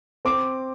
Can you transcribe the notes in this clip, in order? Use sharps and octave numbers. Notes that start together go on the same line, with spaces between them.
C4 D6